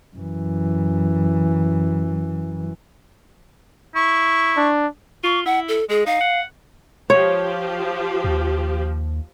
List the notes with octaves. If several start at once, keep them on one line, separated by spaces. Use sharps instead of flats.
F#2 E3
E4 C#6
D4
F4 C#6
E4 F#5
A4
G#3 G#4
D#4 F5
F#5
F3 G4 C#5
D#2